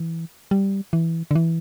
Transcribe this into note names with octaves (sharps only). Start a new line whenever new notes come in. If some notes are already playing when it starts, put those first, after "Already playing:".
Already playing: E3
G3
E3
D3
E3